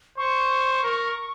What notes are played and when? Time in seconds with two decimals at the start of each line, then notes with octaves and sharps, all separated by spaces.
0.18 C5 C#6
0.83 A#4